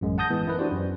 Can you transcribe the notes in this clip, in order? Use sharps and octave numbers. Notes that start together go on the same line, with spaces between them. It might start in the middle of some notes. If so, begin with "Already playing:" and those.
A1 F#2 G#3
F#5 A5 D#6 G6 A#6
E3 G#3 B3
E4 A#4 B4
D4 F#4 G4 C5 D5
F#2